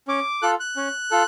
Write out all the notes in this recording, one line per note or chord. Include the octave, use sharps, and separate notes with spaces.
C#4 D6
F4 A4 F#6
F#6
C#4
F4 A4